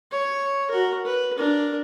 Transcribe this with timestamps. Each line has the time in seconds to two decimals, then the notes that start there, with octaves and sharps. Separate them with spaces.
0.11 C#5
0.71 F#4 A#4
1.05 B4
1.38 D4 A#4